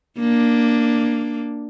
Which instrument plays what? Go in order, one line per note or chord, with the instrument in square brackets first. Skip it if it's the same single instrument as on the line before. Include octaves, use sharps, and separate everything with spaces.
[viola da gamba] A#3 D4